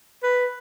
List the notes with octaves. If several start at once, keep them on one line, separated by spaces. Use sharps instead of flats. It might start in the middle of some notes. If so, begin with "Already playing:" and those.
B4